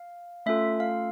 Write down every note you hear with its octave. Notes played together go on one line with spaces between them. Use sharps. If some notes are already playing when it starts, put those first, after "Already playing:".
Already playing: F5
A3 C#4 F4 A4 E5
F5